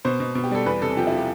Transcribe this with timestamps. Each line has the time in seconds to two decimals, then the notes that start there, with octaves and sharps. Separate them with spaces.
0.05 B2 C5
0.20 B2
0.35 B2
0.44 G4
0.51 G3 A4
0.66 E2 B4
0.82 C3 A4
0.97 F3 G4
1.07 E4
1.12 F3
1.17 G4